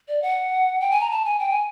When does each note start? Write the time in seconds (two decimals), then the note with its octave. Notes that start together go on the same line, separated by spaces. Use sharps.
0.08 D5
0.22 F#5
0.81 G5
0.91 G#5
1.01 A#5
1.11 A5
1.25 G#5
1.39 G5
1.50 G#5